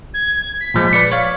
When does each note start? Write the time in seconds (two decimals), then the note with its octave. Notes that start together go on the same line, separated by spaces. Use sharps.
0.14 G#6
0.61 B6
0.74 A#2 F3 G#3
0.93 B4 D5 C#7
1.12 C#5 F5